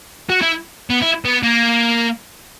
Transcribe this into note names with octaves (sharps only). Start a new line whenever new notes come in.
F#4
E4
B3
E4
B3
A#3